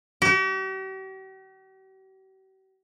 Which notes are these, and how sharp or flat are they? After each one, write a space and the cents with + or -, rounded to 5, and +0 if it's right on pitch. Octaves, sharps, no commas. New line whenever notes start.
G4 -45